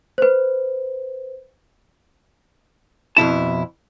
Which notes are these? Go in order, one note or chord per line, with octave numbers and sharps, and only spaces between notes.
B4 C5
F2 B2 E4 A5